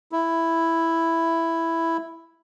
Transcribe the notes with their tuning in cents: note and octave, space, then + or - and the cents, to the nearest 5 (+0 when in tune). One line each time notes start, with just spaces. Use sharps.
E4 +0